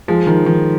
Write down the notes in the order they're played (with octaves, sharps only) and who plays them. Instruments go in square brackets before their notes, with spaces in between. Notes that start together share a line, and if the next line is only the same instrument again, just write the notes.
[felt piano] F3 G#3
D#3
D#3